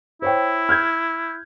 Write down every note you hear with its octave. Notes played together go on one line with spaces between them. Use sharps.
E4 C5 C#5 G5
F6 G6 G#6